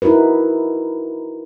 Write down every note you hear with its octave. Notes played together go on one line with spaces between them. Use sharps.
D#4 E4 F#4 A#4 B4